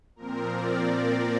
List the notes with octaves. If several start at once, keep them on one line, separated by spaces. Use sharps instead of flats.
A#2 F3 C4 A#4
D5
A#4